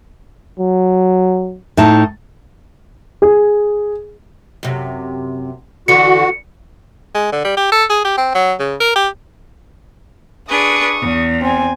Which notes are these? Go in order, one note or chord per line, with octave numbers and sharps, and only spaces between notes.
F#3
A2 D#4 A5
G#4
F#2 C3
D3 E3 F#4 C#7
G#3
D3
G3
G4
A4
G#4
G4
C4
F#3
C#3
A#4
G4
D4 G#4 B4 C#6 D#6
E2
C4 G#5